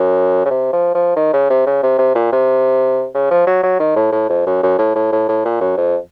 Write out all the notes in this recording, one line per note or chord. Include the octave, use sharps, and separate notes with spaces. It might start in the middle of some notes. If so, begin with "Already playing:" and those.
Already playing: F#2
C#3
C3
F3
F3
D#3
C#3
C3
C#3
C3
C3
A#2
C3
C#3
F3
F#3
F#3
D#3
A2
A2
F2
F#2
F#2
A2
A2
A2
A2
A#2
F#2
F2